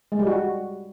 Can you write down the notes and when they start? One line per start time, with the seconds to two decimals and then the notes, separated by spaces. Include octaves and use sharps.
0.12 G#3
0.19 G3
0.27 F#4